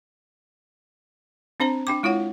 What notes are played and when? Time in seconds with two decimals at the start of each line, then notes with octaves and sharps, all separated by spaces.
1.60 C4 D4 C5 A#5
1.87 D4 G5 D6
2.03 G#3 E4 F4 C#5 F#5